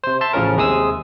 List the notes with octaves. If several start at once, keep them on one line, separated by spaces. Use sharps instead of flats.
C3 C5
E5 A5 C6
A1 A2 C#3 F3 C#4 A#4
D#2 C3 G#3 G#4 D#6 E6